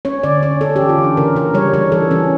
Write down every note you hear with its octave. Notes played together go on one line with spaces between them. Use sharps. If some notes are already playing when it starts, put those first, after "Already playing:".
C#4 C#5
D3 D5
C#4 C#5
C#4 A4
E3 G4
F4
E3
D4
C#3 A#4
C#3 A#4
G3 C#5
E3 C#5
E3 A4
E3 C#4